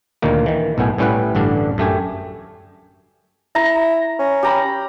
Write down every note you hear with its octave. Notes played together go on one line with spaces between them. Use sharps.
D2 A#2 D#3 A#3
D#3 E3
B1 A2 B3 G#5
A2 G3 C#4 E4 B4 F#5
A1 G2 D3 D4
F#2 A3 G4 G#5
E4 A#5
C#4
G4 A#5 B5